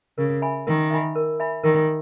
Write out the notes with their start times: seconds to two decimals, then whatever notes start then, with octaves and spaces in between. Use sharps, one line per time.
0.18 C#3 A#4
0.42 E5 G#5 B5
0.67 D#3 A#4
0.91 E5 G#5 B5
1.15 A#4
1.40 E5 G#5 B5
1.64 D#3 A#4